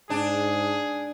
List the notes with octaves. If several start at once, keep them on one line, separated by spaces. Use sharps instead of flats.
G#2 D4 G#4